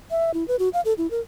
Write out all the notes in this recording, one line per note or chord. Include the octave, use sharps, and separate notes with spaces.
E5
E4
B4
F#4
F5
A4
E4
A#4